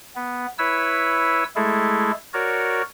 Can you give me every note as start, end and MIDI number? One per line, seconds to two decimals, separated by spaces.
0.16 0.46 59
0.58 1.44 64
0.58 1.44 71
0.58 1.44 73
0.58 1.44 88
1.56 2.12 56
1.56 2.12 57
1.56 2.12 64
1.56 2.12 68
1.56 2.12 69
2.34 2.82 66
2.34 2.82 70
2.34 2.82 73
2.34 2.82 74